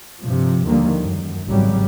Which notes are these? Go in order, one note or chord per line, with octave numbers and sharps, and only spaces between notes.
G2 C3 F3
D#2 D3 D#3 F3 G3 A#3
F#2
G#1 C#3 F#3 G3